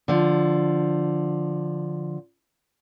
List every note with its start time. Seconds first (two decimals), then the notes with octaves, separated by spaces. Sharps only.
0.08 D3 F3